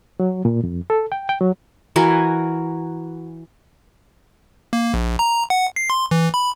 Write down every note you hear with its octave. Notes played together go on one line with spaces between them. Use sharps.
F#3
A#2
F2
A4
G5
G5
F#3
E3 F#4 A#4 G#5
A#3
A#1
A#5
F#5
C7
C6
E3
B5